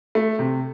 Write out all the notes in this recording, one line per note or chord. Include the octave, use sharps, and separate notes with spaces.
A3
C3